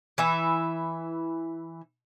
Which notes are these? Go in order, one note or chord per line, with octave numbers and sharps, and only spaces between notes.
E3 B4 E5